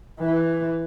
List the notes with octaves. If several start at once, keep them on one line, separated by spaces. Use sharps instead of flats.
E3